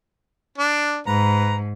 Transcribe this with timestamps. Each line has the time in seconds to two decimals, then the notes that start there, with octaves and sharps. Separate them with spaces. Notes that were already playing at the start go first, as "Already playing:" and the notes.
0.58 D4
1.07 G#2 B4 A#5